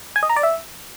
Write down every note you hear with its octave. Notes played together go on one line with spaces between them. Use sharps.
G#5
D#5
A#5
D5
E5